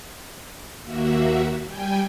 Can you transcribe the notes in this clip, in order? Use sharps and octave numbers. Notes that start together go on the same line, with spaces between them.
D#2 A#3 F#4 E5
G3 G5 G#5